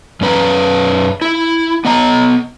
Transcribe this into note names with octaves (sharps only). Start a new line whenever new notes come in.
F#2 C#4 B4 A#5
E4
B3 D#5 A#5